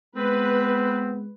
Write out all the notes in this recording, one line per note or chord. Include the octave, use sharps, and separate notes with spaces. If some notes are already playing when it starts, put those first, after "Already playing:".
G#3 B3 C4 B4